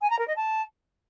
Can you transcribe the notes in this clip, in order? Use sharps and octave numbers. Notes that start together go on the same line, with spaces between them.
G#5
A#5
A#4
D#5
A5